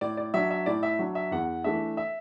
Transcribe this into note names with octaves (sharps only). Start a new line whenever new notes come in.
A2 D5
D5
F#3 D4 E5
E5
A2 D5
E5
F#3 D4
E5
E2 F#5
E3 A3 D4 E5
E5